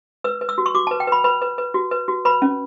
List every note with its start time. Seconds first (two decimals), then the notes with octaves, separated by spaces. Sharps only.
0.24 B4 E6
0.41 B4
0.49 E6
0.58 F#4
0.66 C#6
0.75 F#4 D6
0.87 B4 A5
1.00 G5
1.07 B4 B5
1.24 B4 B5
1.42 B4
1.58 B4
1.74 F#4
1.91 B4
2.08 F#4
2.25 B4 B5
2.42 C#4